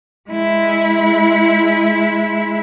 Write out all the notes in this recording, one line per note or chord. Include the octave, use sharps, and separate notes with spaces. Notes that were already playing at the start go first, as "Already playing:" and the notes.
G#3 E4